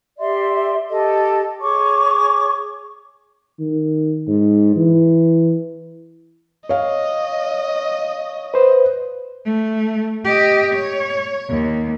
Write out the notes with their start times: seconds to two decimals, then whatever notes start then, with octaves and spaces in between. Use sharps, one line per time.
0.19 G4 D5 E5 C6
0.89 G4 A4 D#5
1.60 G#4 C#5 C#6 D6
3.60 D#3
4.28 G#2
4.77 E3
6.69 C#5 D#5 F5
8.54 B4 C5
9.46 A3
10.24 G4 D#5
10.73 C#5
11.50 D#2